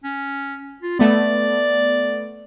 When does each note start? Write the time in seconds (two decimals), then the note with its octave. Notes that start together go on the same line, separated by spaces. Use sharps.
0.04 C#4
0.82 F4
0.99 A3 B3 D5